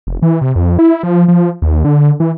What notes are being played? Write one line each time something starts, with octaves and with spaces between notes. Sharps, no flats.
F1
E3
C3
F2
E4
F3
F3
D#2
D3
E3